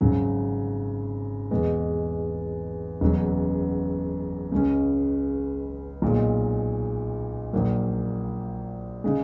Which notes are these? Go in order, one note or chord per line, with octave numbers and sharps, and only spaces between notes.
G#1 F#2 C#3 F#3
E2 B2 G#3
F#1 E2 B2 F#3 C#4
C#2 C#3 G#3 C#4
B1 A#2 G#3
A#1 A#2 F#3 A#3
C#3 G#3